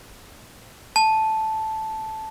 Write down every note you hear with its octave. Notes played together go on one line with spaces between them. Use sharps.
A5